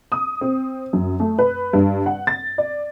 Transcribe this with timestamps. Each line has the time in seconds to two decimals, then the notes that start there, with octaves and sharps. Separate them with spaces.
0.12 D#6
0.41 C4
0.93 F#2
1.20 A3
1.38 B4
1.73 G2
2.06 F#5
2.27 A6
2.58 D5